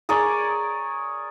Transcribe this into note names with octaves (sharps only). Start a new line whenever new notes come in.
G#4 A#4 C#5 D5